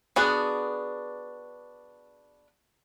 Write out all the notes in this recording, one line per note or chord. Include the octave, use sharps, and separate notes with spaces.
B3 D4 F#4 G#4